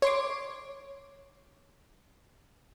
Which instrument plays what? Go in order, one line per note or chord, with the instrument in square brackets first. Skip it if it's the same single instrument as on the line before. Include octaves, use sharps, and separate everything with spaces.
[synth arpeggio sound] C#5 C6 D6